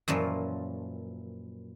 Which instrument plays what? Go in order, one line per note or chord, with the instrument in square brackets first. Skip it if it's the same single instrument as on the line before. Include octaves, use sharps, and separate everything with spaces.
[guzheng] F#2 A#2 E3 F3